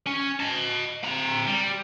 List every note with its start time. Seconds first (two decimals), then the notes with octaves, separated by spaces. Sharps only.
0.07 C#4
0.40 D#5 A5
1.04 C4 A#5
1.47 G3